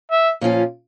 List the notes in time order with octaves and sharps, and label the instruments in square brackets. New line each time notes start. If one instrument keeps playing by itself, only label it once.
[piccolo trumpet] E5
[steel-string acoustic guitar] A#2 F3 C#4 F4